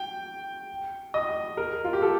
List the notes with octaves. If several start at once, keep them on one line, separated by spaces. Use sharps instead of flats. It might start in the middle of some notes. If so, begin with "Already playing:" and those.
Already playing: G5
D#5
A#4
F4
G4
A4